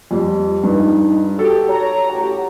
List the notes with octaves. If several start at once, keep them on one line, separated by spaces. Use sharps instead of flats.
F2 G3
G2 D#4
F#4 G4 A4
C#5 A#5
A1 F#4 G4